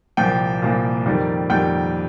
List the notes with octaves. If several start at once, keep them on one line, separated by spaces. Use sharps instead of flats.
C2 A#2 F3 A#3 G5
C2 A#2 F3 A#3
F2 D#3 G3 A#3
F2 D#3 G3 A#3 G5